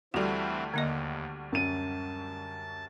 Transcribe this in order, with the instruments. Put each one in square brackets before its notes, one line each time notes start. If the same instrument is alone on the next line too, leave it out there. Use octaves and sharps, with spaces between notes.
[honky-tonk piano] D2 G3 [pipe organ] E3 C4 E4 [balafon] F#4 A4
[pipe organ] D#2 [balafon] D3 A#3 D#5
[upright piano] F#2 D#7 [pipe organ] A5